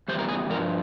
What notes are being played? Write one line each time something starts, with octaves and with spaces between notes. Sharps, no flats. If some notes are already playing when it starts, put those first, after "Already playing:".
E2 E3 G3 C5
A#4
G#4
G2 F3 A#4